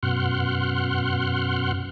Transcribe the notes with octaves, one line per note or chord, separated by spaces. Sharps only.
F#2 B2 F#5 C6 F6 F#6